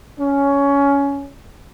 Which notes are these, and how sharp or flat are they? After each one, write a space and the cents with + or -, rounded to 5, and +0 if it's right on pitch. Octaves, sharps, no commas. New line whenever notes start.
C#4 +15